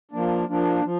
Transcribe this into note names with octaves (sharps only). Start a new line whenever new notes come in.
F3 A#3 D4
F3 A#3 D4
F3